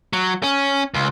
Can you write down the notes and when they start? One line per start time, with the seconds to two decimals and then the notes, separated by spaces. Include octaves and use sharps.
0.13 F#3
0.43 C#4
0.94 C#2